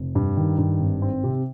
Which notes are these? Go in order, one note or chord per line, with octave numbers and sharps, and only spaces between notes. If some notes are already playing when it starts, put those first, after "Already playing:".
Already playing: F1
G2
D#3
G2
G#1
C4
C3